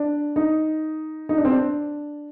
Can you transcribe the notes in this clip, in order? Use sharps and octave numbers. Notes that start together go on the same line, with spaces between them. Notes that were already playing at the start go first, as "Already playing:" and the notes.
Already playing: D4
D#4
D#4
D4
C4
D4